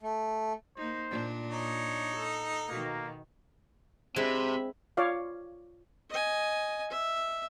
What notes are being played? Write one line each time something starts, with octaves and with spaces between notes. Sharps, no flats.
A3
A#3 D#4 C5
A#2 D4
D#4 C#5
A4
B2 D#3 A#3
C3 G#3 C4 D4 E4 E5 B5
F4 C#5 D5 F5
D#5 G#5
E5